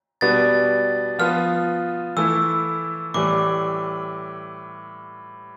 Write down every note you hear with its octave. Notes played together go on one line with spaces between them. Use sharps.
B2 G3 B3 D4 A6
F3 B3 F4 F6
E3 A3 E4 E6
A2 E3 G3 D6